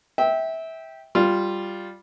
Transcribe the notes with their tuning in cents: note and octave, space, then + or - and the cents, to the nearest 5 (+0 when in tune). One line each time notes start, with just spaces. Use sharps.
E5 -20 G5 +0
G3 +0 F4 +0